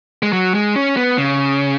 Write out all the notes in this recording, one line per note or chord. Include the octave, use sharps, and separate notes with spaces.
G#3
F#3
G#3
C#4
B3
C#3